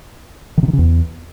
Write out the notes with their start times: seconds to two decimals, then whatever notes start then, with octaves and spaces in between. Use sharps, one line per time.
0.58 D#3
0.63 C3
0.68 D#3
0.73 C#3
0.79 E2